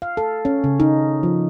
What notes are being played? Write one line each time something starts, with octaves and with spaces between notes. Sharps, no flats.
F5
A4
C#4
C#3
D#4
F3